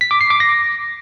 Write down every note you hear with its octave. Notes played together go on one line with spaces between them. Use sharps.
B6
D6
C7
D6
A#6